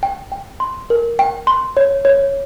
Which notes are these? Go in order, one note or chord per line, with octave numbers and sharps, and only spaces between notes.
G5
G5
C6
A#4
G5
C6
C#5
C#5